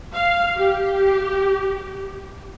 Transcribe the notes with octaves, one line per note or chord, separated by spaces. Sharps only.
F5
G4